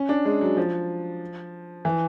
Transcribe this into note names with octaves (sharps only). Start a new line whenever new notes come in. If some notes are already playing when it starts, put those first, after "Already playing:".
Already playing: C#4
D4
G#3
F#3
F3
E3